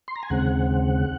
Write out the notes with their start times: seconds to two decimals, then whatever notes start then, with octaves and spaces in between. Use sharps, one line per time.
0.08 C6
0.16 A#5
0.23 G#5
0.30 D#2 C#3 G#3 C4 F#5